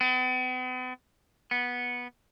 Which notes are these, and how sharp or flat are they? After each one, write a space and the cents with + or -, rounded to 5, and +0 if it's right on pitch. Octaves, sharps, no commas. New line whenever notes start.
B3 +45
B3 -10